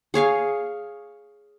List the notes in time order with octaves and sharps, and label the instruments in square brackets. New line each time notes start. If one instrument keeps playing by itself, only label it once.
[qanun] G#4 C#5 F5 G#5